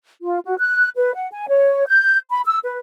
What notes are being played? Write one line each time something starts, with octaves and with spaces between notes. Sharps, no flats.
F4
F#4
F#6
B4
F#5
G#5
C#5
G6
B5
E6
B4